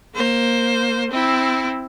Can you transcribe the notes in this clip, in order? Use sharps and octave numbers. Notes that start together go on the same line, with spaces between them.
A#3 C5
C4 E4